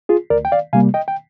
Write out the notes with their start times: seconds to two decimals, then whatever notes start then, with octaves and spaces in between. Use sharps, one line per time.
0.09 F4 G#4
0.30 D2 A#4 D5
0.45 G5
0.52 D5 F5
0.73 C3 G3 A#3 F5 G#5
0.94 D#5 G5
1.08 G5